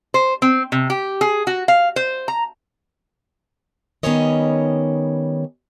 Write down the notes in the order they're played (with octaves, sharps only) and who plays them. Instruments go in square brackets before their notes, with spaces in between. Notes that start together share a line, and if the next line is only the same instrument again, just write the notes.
[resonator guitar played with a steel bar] C5
C4
C3
G4
G#4
F#4
F5
C5
A#5
[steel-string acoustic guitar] D#3 G3 B3 C#4 C#5 D#5